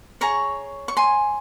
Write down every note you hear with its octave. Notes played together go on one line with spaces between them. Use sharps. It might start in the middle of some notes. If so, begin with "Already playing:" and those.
G#4 C#5 A#5 C#6
C#6
G#5 C6